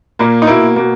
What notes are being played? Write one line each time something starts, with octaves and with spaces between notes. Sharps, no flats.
A#2 A#3
D#4
B2 A#3 E4
B2 A#3